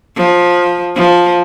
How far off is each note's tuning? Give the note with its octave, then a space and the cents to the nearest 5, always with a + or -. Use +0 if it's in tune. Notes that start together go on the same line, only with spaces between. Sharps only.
F3 +15
F3 +10